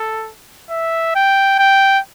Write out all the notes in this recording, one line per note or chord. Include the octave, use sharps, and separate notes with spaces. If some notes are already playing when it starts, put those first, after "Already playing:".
Already playing: A4
E5
G5
G5